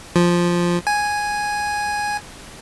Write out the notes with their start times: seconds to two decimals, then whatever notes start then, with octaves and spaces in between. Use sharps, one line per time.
0.16 F3
0.87 G#5